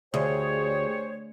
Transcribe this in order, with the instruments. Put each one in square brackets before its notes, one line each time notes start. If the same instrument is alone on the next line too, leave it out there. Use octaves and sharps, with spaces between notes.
[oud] D2 [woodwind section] G4 C5 C#5 [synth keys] G#4